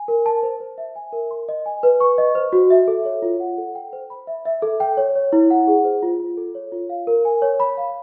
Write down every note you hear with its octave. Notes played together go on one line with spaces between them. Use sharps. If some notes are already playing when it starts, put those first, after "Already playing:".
Already playing: G#5
A#4
A5
C5
C5
E5
G#5
A#4
C6
D#5
G#5
B4
C#6
D#5
C5
F#4
E5
A4
C#5
F4
F#5
A4
G5
C5
B5
E5
E5
A4
G5
C#5
C#5
E4
F#5
G#4
C5
F4
F4
A4
C#5
F4
F5
A#4
G#5
C#5
B5
F5